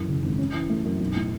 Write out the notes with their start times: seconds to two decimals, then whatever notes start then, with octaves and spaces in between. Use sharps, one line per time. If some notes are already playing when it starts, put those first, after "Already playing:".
Already playing: F#2 E3
0.08 C#3
0.24 G#1
0.39 C#4
0.54 E3
0.70 A3
0.85 F#2
1.00 B1
1.15 A2